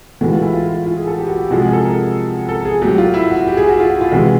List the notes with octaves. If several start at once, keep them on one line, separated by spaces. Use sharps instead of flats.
A2 E3 G#3 F#4
F4
E4
F4
F4
F4
G#4
A4
G4
F#4
G4
C3 F3 G#3 F#4
G#4
A4
A#4
A4
G#4
A2 F#3 G4
F4
E4
F#4
G4
G#4
F#4
F4
F#4
F4
C3 E3 G#3 F#4